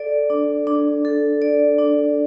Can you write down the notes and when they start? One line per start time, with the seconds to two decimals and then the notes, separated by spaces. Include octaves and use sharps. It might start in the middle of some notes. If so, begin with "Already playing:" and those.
Already playing: A4 D5
0.30 D4
0.67 D4
1.05 A4
1.42 D5
1.79 D4